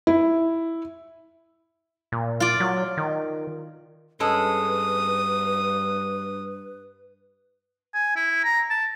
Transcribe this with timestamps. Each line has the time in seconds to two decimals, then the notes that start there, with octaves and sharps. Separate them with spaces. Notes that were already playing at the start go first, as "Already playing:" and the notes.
0.07 E4
2.12 A#2
2.40 F4 D5
2.60 F#3
2.97 D#3
4.20 G2 G#3 C#4 A4 B4 D#6
7.95 G#5
8.16 E4
8.44 A#5
8.70 A5